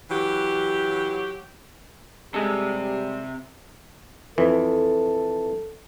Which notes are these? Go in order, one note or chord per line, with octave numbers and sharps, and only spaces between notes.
E3 F#3 G4
C3 G3 G#3 A4
F2 E3 A4